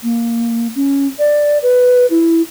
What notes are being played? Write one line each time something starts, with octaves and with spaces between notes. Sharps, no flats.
A#3
C#4
D5
B4
E4